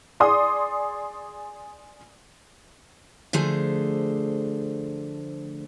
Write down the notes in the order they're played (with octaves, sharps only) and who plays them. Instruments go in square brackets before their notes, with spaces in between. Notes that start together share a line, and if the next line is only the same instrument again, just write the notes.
[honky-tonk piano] G#4 D5 C6 D#6
[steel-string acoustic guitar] D3 F3 A3 G#4 C5